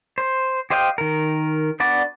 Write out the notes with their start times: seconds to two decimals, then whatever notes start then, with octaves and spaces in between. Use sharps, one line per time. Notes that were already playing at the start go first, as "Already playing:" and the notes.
0.18 C5
0.70 G4 C5 D#5 F5 G5
0.98 D#3 A#4
1.80 B3 D4 F#4 D5